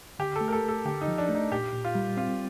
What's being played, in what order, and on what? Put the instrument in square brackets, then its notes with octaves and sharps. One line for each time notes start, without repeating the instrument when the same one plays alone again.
[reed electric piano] D3 [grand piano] G4
[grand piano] A4
[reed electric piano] A3
[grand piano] A#4
A4
[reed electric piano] A3 [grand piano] A4
[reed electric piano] D3 [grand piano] G4
[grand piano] D#4
[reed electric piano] F3
[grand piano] D4
[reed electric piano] A3
[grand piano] D#4
[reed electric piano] A#2 [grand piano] G4
[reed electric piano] A#2
[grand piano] F4
[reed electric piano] G3
[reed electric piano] C4 [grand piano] F4